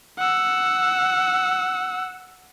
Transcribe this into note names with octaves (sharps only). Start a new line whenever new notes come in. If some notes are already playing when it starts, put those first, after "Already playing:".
F#5 E6